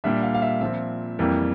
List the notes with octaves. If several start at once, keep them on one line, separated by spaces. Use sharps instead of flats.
A#2 G3 D4 E5
F5
F5
E5
A#2 F3 C4 E5
F2 E3 G3 A#3